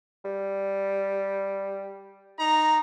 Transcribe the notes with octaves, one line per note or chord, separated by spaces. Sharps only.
G3
D#4 A#5